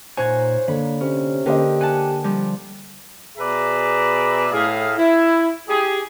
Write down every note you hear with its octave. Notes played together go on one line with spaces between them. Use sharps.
A#2 D#4 C5 C#5 F#5 G#5
D3 A#3 B5
C3 C#4
D3 A#3 G4 C5 D#5
F#5 G#5 A5
F3 G3
B2 G#4 B4 D5 E5 A#5
A2 G#4 F5
E4
G4 G#4